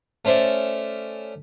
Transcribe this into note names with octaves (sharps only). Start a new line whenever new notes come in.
A3 C#4 C5 D5 E5